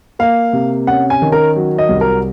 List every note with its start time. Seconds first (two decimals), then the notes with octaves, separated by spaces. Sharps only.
0.19 A#3 F5
0.53 C3
0.87 C#4 F#5
1.10 G#5
1.22 D#3
1.32 A#4
1.56 F#3
1.78 D#5
1.89 C2
2.01 A#4